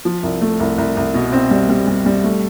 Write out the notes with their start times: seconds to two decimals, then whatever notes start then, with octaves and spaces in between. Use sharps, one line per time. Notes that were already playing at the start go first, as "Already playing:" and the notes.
0.05 F3
0.23 C2
0.41 A3
0.60 C2
0.78 C2
0.97 C2
1.14 B2
1.33 C4
1.51 G3
1.69 G3
1.87 G3
2.06 G3
2.24 A3